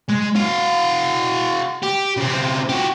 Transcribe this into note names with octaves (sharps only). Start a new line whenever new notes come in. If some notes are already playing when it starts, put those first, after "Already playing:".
G#3
F#4 F5
G4
C#3 C4
F#4 G4